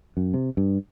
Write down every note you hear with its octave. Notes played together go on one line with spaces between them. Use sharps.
F#2
C3
G2